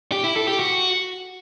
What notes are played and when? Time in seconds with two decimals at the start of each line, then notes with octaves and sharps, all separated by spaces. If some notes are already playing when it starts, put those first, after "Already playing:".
0.12 G4
0.24 E4
0.36 A4
0.48 G4
0.59 F#4